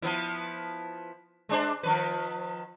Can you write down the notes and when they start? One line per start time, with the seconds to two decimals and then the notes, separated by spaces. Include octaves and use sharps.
0.02 F3 B3 E4
1.49 G#3 D4 C5
1.83 D#3 F3 B4